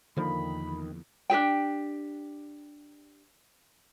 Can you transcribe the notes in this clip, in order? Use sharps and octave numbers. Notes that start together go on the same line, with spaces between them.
E2 D3 D#3 F3 A#3 B5
D4 G4 G#4 G5